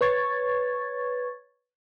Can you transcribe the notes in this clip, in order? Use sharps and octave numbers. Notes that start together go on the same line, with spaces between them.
B4 C#5 C#6 G#6 A6